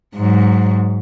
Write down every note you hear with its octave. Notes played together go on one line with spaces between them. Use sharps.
G#2 F#3